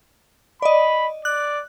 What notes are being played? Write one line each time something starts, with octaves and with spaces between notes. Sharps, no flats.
D5 D#5 B5
D5 F#6